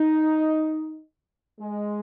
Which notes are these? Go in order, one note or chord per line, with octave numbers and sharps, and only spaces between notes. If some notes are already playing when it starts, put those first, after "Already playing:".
Already playing: D#4
G#3